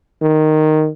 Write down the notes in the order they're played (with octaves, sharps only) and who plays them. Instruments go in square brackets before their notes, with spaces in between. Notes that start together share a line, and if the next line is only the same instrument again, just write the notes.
[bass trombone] D#3